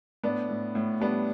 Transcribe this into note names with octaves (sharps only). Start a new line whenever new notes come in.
A2 B3 D4
A2
A2
G3 B3 D4